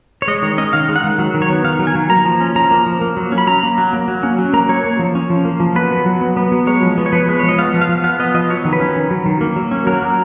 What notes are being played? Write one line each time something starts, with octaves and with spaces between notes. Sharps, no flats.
C#5
G#3 D#5
D#3 C#5
C#4 D#5
D#3 F5
G#3
F#5
D#3
F#3
D#3
C#5
B3
D#3 F5
F#3
G#5
D#3
A#3 A#5
F3
C#4
F3 A#5
A#3
F3
A#3
F#3
C#4
B5
F#3 A#5
A#3
F#3
A#3
F#3
C#4
F#3
A#3 A#5
F#3 C#5
A#3
F3
C#4
F3
A#3
F3
B3 B4
F#3
F#3
B3
B3
F#3
G#3 C#5
F3
B3
C#5
F3 B4
G#3 B4
F3 C#5
D#5
B3 F5
F3
F5
F3
B3 F5
B3 D#5
F3 D#5
F#3 C#5
D#3
B4
C#4
D#3
F#3
D#3
A#3
F#3
C#4
F#3 A#4
A#3